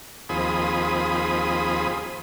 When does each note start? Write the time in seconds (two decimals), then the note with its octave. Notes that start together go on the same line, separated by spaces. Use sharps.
0.29 D#2 F3 C4 G#4 B5 D#6